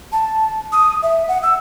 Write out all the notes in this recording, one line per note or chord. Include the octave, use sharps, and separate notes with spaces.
A5
D#6
E5
F#5
E6